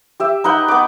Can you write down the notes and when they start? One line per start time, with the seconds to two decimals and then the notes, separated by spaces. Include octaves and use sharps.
0.20 G4 E5
0.44 D#4 B4 F#5 G5
0.68 B3 D6